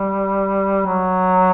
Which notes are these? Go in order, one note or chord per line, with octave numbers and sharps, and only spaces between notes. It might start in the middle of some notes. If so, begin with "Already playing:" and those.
Already playing: G3
F#3